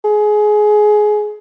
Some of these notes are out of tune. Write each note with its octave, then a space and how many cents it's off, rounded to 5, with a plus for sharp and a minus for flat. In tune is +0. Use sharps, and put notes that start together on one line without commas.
G#4 +20